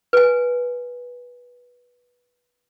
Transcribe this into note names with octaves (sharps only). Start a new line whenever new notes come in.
B4 G#5